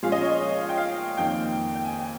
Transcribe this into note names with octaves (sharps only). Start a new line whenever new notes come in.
A#2 F3 G#3 C#4 F5
D#5
C#5
D#5
F5
G5
F5
F2 D#3 A#3 G5
G5
G#5
G5